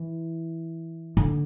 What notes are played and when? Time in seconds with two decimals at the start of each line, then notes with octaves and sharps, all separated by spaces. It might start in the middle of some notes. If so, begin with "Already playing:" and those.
Already playing: E3
1.17 D3